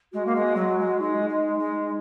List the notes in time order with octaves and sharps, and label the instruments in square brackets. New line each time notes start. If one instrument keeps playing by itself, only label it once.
[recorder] G#3 [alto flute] F#4
[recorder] A#3
G#3
F#3
G#3
[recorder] G#3 [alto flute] D#4
[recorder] G#3
G#3